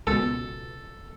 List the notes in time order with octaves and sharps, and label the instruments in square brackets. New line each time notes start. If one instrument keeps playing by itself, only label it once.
[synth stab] C#2 B2 [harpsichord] A4